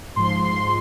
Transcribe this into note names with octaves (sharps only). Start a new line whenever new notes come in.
G#2 F3 C6
C6